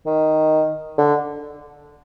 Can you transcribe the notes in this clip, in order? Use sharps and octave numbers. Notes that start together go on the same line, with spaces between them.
D#3
D3